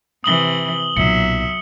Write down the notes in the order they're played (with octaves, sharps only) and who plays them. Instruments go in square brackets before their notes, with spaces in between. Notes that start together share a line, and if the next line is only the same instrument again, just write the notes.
[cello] C3 E3 [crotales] D#6 F#7 G7
[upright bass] B1 A#2 [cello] F#3 E5 [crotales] C#7